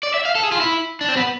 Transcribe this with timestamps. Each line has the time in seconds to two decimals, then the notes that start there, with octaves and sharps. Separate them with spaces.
0.03 D5
0.14 E5
0.25 F5
0.35 A4
0.43 G#4
0.52 F4
0.60 E4
1.01 D4
1.09 C4
1.17 B3